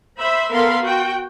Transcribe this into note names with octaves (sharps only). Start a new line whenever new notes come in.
C5 E5 B5
B3 A4 A#4 F5 B5 C6
F#4 G5